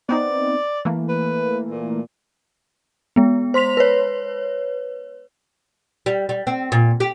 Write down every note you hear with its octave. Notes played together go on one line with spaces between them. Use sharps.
B3 C4 D#4 D5
E3 A3 A#3
B4
A#2
G#3 B3
C5 C6 B6 F7
B4 C#5
G3
G3
C4
A#2
G4